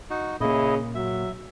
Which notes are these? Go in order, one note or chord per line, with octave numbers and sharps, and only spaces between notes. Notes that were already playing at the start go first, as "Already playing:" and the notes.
D#4 F#4
A#2 C#3 A#3 E4 D#5
F#3 E5